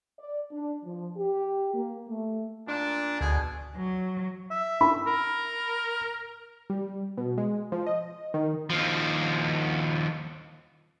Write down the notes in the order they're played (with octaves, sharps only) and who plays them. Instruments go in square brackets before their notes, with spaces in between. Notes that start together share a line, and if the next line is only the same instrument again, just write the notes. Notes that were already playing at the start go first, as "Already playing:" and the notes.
[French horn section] D5
D4
F3
G4
A#3
A3
[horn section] A#2 D4
[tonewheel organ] D2 [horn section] B2 D3 G#4
[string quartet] F#3
[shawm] E5
[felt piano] B5
[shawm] A#4
[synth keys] G3
B2
G#3
F3
D#5
D#3
[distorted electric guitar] D#2 F3